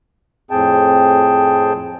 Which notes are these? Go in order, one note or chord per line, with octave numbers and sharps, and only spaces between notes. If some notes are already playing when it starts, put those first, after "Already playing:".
F2 A2 C4 G#4 G5 A5